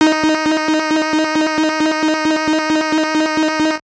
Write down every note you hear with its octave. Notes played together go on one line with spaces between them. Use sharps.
D#4